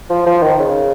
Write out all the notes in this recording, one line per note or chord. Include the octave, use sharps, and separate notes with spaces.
F3
F3
D#3
C#3